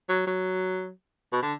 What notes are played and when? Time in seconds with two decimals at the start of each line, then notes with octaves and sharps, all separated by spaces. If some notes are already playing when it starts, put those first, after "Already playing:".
0.09 F#3
0.27 F#3
1.33 B2
1.43 D3